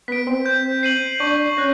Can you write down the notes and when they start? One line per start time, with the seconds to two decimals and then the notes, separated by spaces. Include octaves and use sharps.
0.08 B3 B4 B6 D7
0.27 C4 C5
0.46 G6
0.83 C7 D#7 F#7
1.20 D4 D5 C#6
1.57 C#4 C#5 F#6 A#6